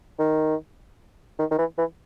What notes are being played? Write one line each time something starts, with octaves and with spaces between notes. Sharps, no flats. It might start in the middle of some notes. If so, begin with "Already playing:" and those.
D#3
D#3
D#3
E3
E3